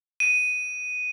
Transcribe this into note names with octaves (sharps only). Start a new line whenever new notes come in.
D#7